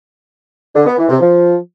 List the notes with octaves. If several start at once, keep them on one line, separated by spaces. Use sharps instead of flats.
D3
B3
E3
C3
F3